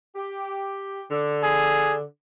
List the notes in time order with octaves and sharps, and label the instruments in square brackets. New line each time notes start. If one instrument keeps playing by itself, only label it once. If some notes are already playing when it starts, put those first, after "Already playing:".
[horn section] G4
D3
[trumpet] G#4